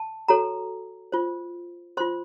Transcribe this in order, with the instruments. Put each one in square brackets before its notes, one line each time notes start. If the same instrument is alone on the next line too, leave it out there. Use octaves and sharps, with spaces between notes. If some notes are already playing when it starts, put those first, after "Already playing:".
Already playing: [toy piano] A5
F#4 A4 C#5 A#5
F4 C5
F4 C5 C6